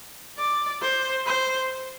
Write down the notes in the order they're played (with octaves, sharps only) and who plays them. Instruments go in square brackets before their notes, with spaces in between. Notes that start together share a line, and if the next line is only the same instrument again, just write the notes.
[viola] D5
C5
C5